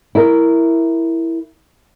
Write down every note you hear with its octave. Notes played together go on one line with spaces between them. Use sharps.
E4 A#4